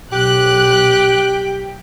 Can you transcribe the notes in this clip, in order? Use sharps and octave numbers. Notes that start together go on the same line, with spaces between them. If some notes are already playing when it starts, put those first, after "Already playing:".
B1 G4 F#6